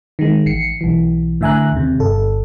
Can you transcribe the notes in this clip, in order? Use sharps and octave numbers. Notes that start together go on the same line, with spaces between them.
D#3 G#3
A1 C7 C#7
B1 E3
A2 D3 E5 G#5 A#5 F#6
D#2 C3
G1 A4